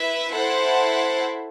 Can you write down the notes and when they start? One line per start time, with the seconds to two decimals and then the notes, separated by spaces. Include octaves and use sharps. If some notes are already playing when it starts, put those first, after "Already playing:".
Already playing: E4 B4 E5
0.33 E4 A4 C5 F#5